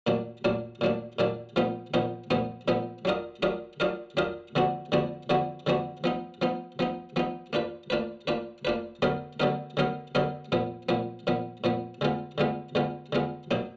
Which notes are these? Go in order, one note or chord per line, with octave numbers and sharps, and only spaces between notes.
A#2 F#3 A#3 D4
A#2 F#3 A#3 D4
A#2 F#3 A#3 D4
A#2 F#3 A#3 D4
A#2 F3 B3 D#4
A#2 F3 B3 D#4
A#2 F3 B3 D#4
A#2 F3 B3 D#4
F#3 D4 F4 A#4 D#5
F#3 D4 F4 A#4 D#5
F#3 D4 F4 A#4 D#5
F#3 D4 F4 A#4 D#5
D3 F3 B3 D4 F#4
D3 F3 B3 D4 F#4
D3 F3 B3 D4 F#4
D3 F3 B3 D4 F#4
F3 B3 D#4
F3 B3 D#4
F3 B3 D#4
F3 B3 D#4
A#3 D4 F4 B4
A#3 D4 F4 B4
A#3 D4 F4 B4
A#3 D4 F4 B4
D3 F#3 B3 D#4 A#4
D3 F#3 B3 D#4 A#4
D3 F#3 B3 D#4 A#4
D3 F#3 B3 D#4 A#4
A#2 F3 B3
A#2 F3 B3
A#2 F3 B3
A#2 F3 B3
D3 G#3 B3 F4
D3 G#3 B3 F4
D3 G#3 B3 F4
D3 G#3 B3 F4
B2 F#3 A#3 D#4